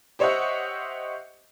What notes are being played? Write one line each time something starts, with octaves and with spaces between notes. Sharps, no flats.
G4 C5 C#5 D#5 E5 F#5